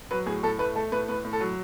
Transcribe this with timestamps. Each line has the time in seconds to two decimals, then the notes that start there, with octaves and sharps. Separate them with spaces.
0.11 F#3 B4
0.26 A2 G#4
0.43 A2 A4
0.59 A3 B4
0.75 A3 A4
0.92 A2 B4
1.08 A2 B4
1.24 A2
1.33 A4
1.41 F#3